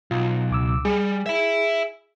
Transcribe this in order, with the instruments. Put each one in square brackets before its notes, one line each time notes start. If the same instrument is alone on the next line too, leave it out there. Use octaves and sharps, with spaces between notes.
[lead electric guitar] B1 [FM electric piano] F4
[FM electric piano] C#2 D6 E6
[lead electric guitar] G3 [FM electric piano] G#4
[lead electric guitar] E5 B5